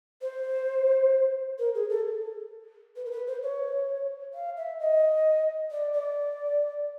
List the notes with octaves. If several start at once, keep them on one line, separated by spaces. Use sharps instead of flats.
C5
A#4
G#4
A4
B4
A#4
B4
C5
C#5
F5
E5
D#5
D5
D5